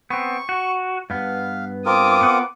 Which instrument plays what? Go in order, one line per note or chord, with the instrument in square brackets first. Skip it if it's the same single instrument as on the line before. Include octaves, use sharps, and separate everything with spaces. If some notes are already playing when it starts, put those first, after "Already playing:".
[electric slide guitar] B3 C4 [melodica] C#6
[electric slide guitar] F#4
[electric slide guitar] G2 B3 [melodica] F5
[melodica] C4 F4 A#4 [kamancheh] D6 D#6
[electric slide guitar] B3 F#5